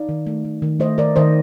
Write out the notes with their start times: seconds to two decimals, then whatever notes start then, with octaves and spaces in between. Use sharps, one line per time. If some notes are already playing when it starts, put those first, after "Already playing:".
Already playing: D#4 D5 F5
0.09 D#3
0.27 A3
0.45 A3
0.62 D#3
0.80 A3 C5 D#5
0.98 D#3 A#4 D5
1.16 D#3 C5 D#5